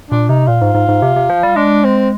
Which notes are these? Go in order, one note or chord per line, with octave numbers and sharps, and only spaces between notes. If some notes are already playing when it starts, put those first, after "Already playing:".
A#2 D4
C3 D#4
A#2 F4
G#2
G#2
G#2
C3
C3
F3
G3
G#3 D4
C4